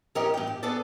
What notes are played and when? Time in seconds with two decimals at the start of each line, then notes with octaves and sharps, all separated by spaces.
0.15 E3 C#4 G4 A#4 D#5
0.34 G2 G5
0.47 G4
0.63 B3 G#4 A4 D5